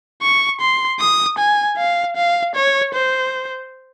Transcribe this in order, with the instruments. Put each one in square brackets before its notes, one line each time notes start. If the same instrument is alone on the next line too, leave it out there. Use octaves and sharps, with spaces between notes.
[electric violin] C#6
C6
D#6
G#5
F5
F5
C#5
C5